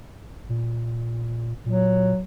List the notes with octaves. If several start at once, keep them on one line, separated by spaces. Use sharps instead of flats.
A#2
A#2 F#3